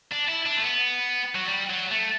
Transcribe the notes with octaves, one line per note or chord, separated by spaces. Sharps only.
D4
E4
D4
A3
B3
F#3
G3
F#3
A3